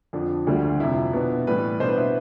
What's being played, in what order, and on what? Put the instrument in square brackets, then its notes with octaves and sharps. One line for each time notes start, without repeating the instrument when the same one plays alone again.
[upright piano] F2 D3 F3 D4
D2 D3 G3
F2 C3 F3 E4
B2 B3 D4
A2 E3 G3 B4
B2 B3 D4 C5
B4
E4